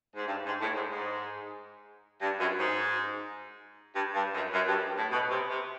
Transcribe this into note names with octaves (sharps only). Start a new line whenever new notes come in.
G#2
G2
G#2
A2
G#2
G#2
G2
F#2
G#2
G2
G2
F#2
F#2
G2
A2
B2
C3
C3